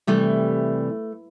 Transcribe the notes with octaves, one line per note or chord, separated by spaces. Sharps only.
C3 E3 G3 A3